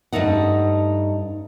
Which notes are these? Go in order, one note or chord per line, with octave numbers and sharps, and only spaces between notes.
G2 G#3 A3 D#4 F#5